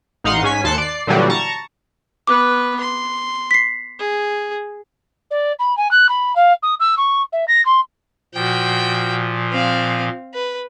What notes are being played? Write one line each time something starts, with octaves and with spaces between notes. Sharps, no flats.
A1 D#4 F5 F#5 C6
G#2 C#4 G#5 B6
D#2 A5 C6 F#6 C#7
D5 C7
A#2 D3 E3 F#3 G3
A5 A#5 C#6
B3 B4 D6
C6
B6 C7
G#4
D5
B5
G#5
F#6
B5
F5
D#6
E6
C#6
E5
A#6
C6
A#2 F3 F#4 G5
C4 F5
B4